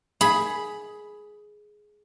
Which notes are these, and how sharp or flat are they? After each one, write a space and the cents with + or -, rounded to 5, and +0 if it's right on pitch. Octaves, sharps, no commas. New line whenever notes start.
G#4 +10 B5 +0